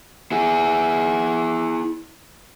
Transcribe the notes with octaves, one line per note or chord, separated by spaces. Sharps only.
E4 G#4